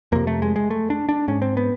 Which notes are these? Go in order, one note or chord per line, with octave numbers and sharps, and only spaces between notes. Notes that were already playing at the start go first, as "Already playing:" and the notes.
F2 C3 A#3
A3
G#3
G#3
A3
D4
D4
G#2 C#4
C4
B3